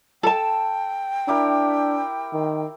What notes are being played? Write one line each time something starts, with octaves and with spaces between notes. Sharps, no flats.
A4 G5 A5
D4 E4 G4 A#4
D#3